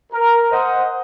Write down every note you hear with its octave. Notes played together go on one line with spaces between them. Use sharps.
A#4
C5 D#5 F#5